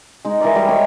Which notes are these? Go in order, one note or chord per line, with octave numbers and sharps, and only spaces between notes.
G#3 D#4
E3 A#4 D5
G3 G#3 D#5
C#5 G5 G#5